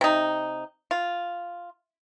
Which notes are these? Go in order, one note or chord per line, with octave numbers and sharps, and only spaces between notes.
C3 D#4
F4